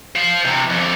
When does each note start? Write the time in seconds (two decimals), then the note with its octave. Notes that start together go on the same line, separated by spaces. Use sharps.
0.16 C5 F5
0.45 C3 E3
0.70 F2 D3